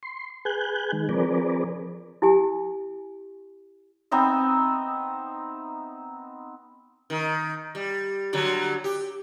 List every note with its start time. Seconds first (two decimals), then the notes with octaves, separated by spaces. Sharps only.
0.03 C6
0.45 G#4 B4 G#5 F#6 G6
0.92 D#3 G#3
1.09 F3 C4 G#4 A#4 B4 D5
2.22 E4 G4 G#5
4.11 B3 C4 D#4 E5
7.10 D#3
7.75 G3
8.33 D3 F#3 G3
8.84 G4